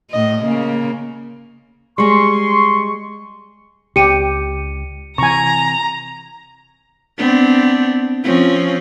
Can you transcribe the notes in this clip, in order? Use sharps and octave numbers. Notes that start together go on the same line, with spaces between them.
A2 D#5
C#3 A#3
G3 G#3 C6 C#6
C#2 G4 C#7 D#7
C3 E3 G#5 A#5 C#6
B3 C4 D4
F3 C4 C#4